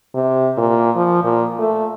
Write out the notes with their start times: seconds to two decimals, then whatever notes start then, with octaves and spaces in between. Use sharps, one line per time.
0.15 C3
0.57 A#2
0.96 F3
1.24 A#2
1.59 A3